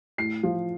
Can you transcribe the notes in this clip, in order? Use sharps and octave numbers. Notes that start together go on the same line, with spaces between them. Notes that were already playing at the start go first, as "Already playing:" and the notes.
A2 C7
F3